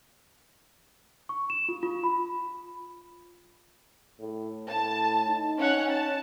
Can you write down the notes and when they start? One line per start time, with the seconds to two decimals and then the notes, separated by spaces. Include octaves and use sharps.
1.29 C#6
1.50 E7
1.69 F4
1.83 F4
2.04 B5
4.20 A2
4.69 A2 A5
5.27 D#4
5.58 C#4 C#5 F#5
5.91 A5